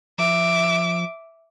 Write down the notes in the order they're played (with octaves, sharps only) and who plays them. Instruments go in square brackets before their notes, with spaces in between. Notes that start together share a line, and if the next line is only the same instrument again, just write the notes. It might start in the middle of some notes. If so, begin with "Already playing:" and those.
[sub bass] F3 [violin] E5 D6